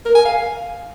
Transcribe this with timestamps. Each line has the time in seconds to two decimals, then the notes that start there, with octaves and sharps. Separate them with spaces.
0.05 A#4
0.15 G#5
0.25 F5